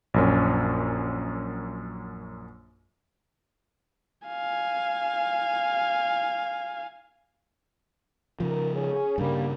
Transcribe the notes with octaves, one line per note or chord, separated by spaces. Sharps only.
A#1 F#2 C#4
F5 G#5
C#3 F3 A#4
C#4 G#4
G2 C#3 G3 A#3